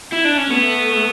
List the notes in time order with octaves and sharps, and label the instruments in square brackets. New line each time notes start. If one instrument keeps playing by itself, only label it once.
[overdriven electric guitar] E4
D4
C#4
[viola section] A3 [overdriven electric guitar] B3